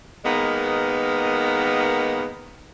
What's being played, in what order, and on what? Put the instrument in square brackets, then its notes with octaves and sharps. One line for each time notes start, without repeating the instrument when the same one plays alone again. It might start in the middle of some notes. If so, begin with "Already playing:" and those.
[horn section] D#3 G#3 A#3 B3